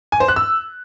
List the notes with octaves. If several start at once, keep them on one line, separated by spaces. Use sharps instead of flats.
G#5
C5
F#6
E6